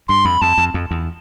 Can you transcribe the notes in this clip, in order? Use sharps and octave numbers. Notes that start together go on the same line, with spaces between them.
G2 C6
F2 B5
F2 A5
F2
F2
E2